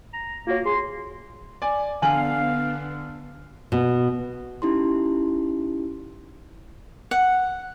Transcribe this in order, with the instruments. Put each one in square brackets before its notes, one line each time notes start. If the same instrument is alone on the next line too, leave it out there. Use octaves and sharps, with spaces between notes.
[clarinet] A#5
[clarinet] A#3 [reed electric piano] F4 F#4 C#5
[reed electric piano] G#4 [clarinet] C6
[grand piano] D5 G#5
[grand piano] D3 F#7 [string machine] B3 D4 [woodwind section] F5 [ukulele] G#5
[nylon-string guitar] B2
[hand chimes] C#4 D#4 E4 G4 C6
[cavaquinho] F#5